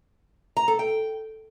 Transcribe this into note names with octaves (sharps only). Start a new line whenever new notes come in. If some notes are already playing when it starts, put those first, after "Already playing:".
A#5
A4
G5